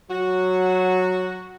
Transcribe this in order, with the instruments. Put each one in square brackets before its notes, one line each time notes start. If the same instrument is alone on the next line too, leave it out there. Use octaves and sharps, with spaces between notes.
[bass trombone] F#3 [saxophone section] F#4